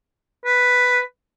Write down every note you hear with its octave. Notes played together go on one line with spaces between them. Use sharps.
B4